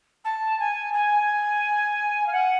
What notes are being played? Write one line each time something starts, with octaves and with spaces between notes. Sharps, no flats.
A5
G#5
G#5
F5
F#5